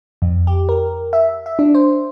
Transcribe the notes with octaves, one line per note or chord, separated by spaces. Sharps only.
F2
G4
A#4
E5
E5
D4
C5